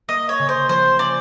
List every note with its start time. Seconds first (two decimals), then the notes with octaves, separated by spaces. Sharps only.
0.08 A#3 D#5
0.29 C#5
0.39 C#3
0.49 C5
0.69 F3 C5
0.99 C#4 D5